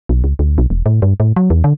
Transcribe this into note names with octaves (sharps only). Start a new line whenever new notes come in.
B1
C#2
D2
B1
E1
A2
G2
A2
F#3
E2
D3